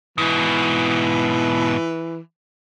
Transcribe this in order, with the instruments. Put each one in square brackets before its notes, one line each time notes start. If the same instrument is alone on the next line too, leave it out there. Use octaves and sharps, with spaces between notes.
[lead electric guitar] G#2 B2 [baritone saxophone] E3